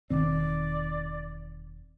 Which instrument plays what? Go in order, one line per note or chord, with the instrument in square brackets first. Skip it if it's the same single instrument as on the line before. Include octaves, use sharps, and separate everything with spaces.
[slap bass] E1 D#3 C4 [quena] D5